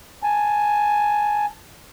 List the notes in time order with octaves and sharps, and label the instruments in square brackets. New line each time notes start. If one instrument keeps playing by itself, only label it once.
[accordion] G#5 A5